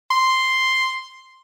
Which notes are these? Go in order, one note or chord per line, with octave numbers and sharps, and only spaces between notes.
C6